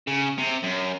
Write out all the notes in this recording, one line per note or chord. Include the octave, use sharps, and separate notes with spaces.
C#3
C3
F#2